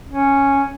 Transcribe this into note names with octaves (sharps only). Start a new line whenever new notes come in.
C#4